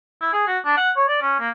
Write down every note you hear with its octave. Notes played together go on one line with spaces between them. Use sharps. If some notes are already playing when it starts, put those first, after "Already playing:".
E4
G#4
F#4
D4
F#5
C#5
D5
C#4
A#3